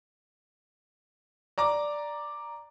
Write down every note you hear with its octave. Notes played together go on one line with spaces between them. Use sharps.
D5 A#5 D6